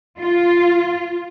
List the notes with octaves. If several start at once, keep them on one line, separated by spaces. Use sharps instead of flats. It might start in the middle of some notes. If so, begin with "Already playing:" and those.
F4